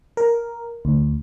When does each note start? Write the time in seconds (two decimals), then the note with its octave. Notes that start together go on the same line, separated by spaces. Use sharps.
0.17 A#4
0.85 D2